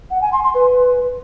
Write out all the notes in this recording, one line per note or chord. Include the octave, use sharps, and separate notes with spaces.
F#5
G#5
C6
C6
B4